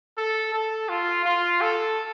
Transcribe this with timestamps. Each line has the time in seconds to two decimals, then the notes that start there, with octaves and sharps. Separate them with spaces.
0.17 A4
0.53 A4
0.89 F4
1.25 F4
1.61 A4